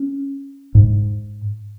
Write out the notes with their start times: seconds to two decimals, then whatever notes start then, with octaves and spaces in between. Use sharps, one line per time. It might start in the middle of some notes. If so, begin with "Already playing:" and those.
Already playing: C#4
0.75 G#2